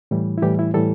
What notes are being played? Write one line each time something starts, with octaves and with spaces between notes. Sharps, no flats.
A2 E3 G3
E4
A2 E3 G3 G4
E4
A2 E3 G3 A4